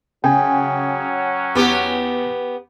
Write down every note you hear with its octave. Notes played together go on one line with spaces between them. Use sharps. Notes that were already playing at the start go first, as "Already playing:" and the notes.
C#3 F#3 C#4 F#4 G5 G#5
E2 B3 G4